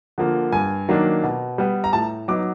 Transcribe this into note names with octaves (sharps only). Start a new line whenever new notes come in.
D3 F3 A#3
G2 G#5
D#3 F#3 A#3 D4
B2
G3 B3
A#5
A2 A5
F#3 B3 D#4 D6